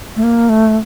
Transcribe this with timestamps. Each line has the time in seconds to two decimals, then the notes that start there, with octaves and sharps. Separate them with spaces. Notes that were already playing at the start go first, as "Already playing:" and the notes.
0.16 A3
0.23 A#3
0.49 A3